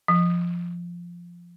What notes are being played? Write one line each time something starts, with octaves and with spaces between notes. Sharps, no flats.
F3